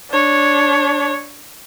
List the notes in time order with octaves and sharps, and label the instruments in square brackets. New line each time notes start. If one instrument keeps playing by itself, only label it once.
[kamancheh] D4 C#5